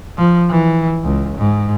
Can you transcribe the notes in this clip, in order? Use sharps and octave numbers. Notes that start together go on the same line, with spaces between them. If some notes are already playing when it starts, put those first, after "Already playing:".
F3
E3
C#2
G#2